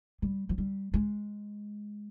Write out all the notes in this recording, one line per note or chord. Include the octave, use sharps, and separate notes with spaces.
G3
F3
G3
G#3